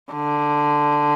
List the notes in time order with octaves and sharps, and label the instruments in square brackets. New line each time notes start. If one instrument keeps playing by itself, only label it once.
[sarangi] D3